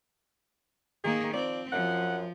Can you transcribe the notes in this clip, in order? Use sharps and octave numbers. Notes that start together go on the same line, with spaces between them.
D#3 A#3 G#4
F3 C4 D5
F#2 F3 F#5